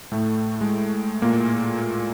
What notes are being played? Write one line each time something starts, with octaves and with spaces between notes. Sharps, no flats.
A2 A3
G#3
A#2 A#3